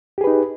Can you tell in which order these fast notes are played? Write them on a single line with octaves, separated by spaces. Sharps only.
G4 G#4 B4 D#4